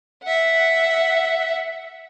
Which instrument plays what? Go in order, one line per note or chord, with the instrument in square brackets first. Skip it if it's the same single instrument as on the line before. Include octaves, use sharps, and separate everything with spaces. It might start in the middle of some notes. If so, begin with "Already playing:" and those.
[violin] E5 F#5